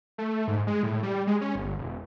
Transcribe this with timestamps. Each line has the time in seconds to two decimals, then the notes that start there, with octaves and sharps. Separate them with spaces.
0.18 A3
0.48 G#2
0.67 G#3
0.83 A2
1.03 G3
1.27 G#3
1.41 C#4
1.55 G1
1.78 E1